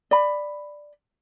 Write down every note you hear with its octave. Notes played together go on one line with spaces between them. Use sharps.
D5 B5